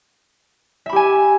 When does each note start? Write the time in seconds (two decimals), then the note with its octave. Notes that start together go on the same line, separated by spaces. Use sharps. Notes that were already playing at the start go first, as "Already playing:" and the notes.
0.86 E5
0.89 B5
0.93 G4
0.96 G#5